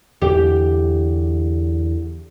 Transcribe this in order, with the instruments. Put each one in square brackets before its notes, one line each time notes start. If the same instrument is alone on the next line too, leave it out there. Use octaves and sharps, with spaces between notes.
[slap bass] E2 D3 [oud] G4